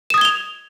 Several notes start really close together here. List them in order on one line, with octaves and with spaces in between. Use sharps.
E7 D#6 G#6 G7 F7